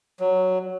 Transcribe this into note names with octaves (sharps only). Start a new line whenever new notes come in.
F#3